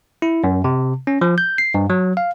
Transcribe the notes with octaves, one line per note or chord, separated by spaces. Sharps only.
E4
F#2
C3
C#4
F3
G6
C7
G2
F#3
F5